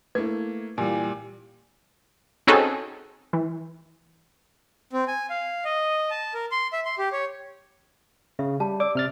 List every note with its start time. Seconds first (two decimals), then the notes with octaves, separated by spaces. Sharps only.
0.15 A3 A#3 E4 B4 G#6
0.78 A#2 E3 G3 G#5
2.47 C4 C#4 D#4 F#4 G#4 A4
3.33 E3
4.93 C4
5.08 G#5
5.30 F5
5.65 D#5
6.10 A5
6.34 A#4
6.51 C6
6.73 E5
6.85 C6
6.98 G4
7.12 C#5
8.39 C#3 E5
8.60 G3 A5
8.80 D5 D6 E6
8.95 C3 F6 A6